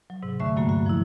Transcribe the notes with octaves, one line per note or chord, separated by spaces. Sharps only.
F#3
G#2 C3
D#2 D3 A3 E5 C#6
G2 F#3 A#3 F#4 A#5
F#4
F3 E4